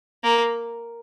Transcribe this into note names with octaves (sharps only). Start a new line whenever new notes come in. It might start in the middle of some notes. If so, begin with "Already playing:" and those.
A#3